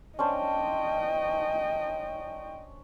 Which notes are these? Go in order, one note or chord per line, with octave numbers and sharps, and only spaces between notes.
C#4 D4 C5 D#5 G5